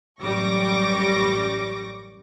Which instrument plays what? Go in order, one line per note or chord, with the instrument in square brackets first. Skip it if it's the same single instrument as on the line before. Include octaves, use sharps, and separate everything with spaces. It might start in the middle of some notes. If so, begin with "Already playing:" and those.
[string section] A1 F#2 G3 C#6 D6 A#6